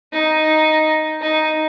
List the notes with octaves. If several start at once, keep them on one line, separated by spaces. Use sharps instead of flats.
D#4
D#4